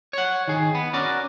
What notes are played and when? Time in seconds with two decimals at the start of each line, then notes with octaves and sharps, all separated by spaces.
0.13 C#5 F#5
0.48 D#3 G#4
0.75 B3
0.93 C#4 F#4 A#4 D5